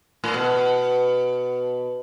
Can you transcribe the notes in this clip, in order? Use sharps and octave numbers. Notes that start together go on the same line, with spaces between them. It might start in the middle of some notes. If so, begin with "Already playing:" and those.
A2
B2